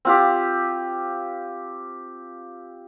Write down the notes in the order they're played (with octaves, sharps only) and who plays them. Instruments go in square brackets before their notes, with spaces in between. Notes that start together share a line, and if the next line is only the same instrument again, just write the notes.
[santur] C4 F4 G4